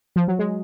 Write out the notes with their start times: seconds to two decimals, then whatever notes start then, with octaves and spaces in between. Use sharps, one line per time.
0.16 F3
0.28 F#3
0.39 G#3